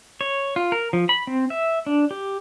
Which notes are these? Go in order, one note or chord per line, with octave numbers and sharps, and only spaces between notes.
C#5
F4
A#4
F3
B5
C4
E5
D4
G4